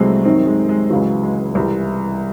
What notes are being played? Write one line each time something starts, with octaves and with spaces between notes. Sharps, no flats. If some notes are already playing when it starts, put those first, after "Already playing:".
Already playing: C2 C3 E3 F#3 G#3 A3 C4
F#2 D#3 C4 D#4
G#3
G#3
C#2 C#3 E3 F#3
G#3
C2 C3 E3